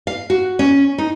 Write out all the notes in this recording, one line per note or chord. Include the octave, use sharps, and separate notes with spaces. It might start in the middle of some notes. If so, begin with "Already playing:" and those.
F5
F#4
C#4
D#4